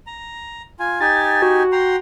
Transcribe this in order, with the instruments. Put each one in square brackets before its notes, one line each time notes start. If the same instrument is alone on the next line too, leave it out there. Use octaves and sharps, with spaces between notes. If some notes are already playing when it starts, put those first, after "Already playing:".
[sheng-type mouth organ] A#5
F4 G#5
[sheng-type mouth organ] D#4 G4 G#5 [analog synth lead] A6
[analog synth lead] F#4
[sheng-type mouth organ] G5 A#5 C6